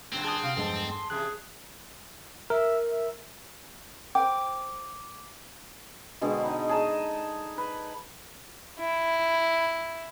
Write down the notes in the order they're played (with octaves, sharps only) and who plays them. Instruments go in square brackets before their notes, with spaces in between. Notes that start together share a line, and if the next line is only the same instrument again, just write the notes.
[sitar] F#2 A#2 D3 [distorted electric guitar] C4
[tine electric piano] G#4 A5 D#6
[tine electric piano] C3 D#6 [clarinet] F5
[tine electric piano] E2 G2 G#3 [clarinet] F3 [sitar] G#4 A4
[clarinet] C6
[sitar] E2 C3 G#3 [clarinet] G#4 [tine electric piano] F#6
[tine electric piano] A#4 [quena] E5
[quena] E5
[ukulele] C5 G5 [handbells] D6
[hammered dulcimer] B2 D3 G#3 C4
B3 D#4
G#4 A5 A#5
B4
[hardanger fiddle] E4